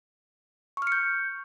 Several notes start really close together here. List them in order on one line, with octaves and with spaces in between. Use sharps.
C#6 F6 C#7 G6